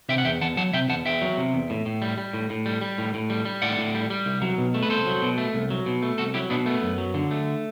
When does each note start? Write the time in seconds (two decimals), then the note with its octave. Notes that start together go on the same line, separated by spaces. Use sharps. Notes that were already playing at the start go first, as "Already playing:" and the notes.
0.09 C3 E5 G5
0.18 F#5
0.25 E2 E5 G5
0.41 E2 F#5 A5
0.57 F#3 F#5 A5
0.73 C3 E5 G5
0.89 E2 F#5 A5
1.06 E2 E5 G5
1.22 F#3
1.38 C3
1.54 E2
1.70 A2
1.86 A2
2.02 G3
2.18 G3
2.33 A2
2.50 A2
2.66 G3
2.81 G3
2.98 A2
3.14 A2
3.30 G3
3.45 G3
3.62 A2 D5 F#5
3.78 A2
3.94 G3
4.10 G3
4.26 C2
4.42 F#3
4.58 B2
4.74 A3
4.82 B4
4.90 C2 A4 C5
5.06 F#3
5.22 B2
5.38 A3
5.54 C2
5.70 F#3
5.86 B2
6.02 A3
6.18 C2 F#4 A4
6.34 F#3 E4 G4
6.50 B2 B3 D4
6.66 A3 B3
6.83 F#2
6.98 F#3
7.14 D3
7.31 A3